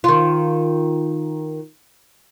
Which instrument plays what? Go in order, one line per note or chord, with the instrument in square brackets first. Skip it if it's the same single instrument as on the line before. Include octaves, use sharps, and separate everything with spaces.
[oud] D#3 F4